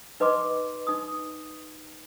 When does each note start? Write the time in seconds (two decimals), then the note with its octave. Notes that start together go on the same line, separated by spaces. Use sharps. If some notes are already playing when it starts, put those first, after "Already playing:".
0.20 D#4 B4 D#5 C6 D6
0.87 D#4 D#6